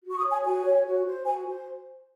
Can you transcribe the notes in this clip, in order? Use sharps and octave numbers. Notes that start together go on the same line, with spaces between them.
F#4
C#6
D#6
C#5
G#5
F#4 G#5
C#5
F#4
C5
F#4 G#5
C5